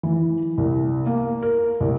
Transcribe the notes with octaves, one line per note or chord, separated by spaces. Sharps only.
E3
C2
A#3
A#4
C2